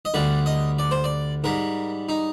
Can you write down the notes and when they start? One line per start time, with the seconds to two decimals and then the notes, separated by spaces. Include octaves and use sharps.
0.05 D#5
0.14 D2 D3 G3 D5
0.46 D#5
0.79 D5
0.91 C5
1.04 D5
1.44 G#2 G3 A#4
2.09 D#4